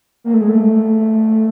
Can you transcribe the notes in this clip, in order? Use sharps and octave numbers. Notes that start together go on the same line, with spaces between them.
A#3
A3
G#3
A3